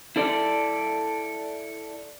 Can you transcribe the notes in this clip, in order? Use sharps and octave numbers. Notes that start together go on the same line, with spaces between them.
E4 A4 D5